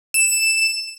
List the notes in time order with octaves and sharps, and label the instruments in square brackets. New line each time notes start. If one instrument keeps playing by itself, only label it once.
[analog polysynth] E7